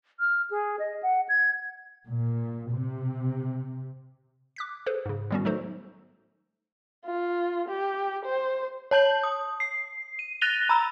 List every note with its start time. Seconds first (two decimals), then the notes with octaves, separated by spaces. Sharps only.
0.19 F6
0.50 G#4
0.79 D#5
1.02 F#5
1.29 G#6
2.07 A#2
2.72 C3
4.56 D6 F#6 B6
4.86 G#4 A4 B4 C5
5.05 G#2 C#3
5.30 A2 D#3 G3 B3 C#4 F#4
5.45 F#3 A3 D#4 F#4 A4 C5
7.05 F4
7.68 G4
8.25 C5
8.91 C#5 A5 G6 F#7
9.23 D#6
9.60 C7
10.19 D#7
10.41 F#6 A6 A#6 D#7 F7 G7
10.69 A#5 B5 E6